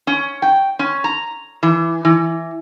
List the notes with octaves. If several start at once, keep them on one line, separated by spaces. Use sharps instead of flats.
C#4
G5
C#4
A#5
E3
E3